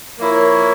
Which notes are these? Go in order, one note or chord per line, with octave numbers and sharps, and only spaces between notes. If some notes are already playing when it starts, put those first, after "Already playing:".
F3 A#3 E4 A#4 C#5